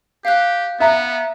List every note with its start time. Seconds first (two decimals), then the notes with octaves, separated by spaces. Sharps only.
0.25 G4 F5 F#6
0.80 B3 E5 A#5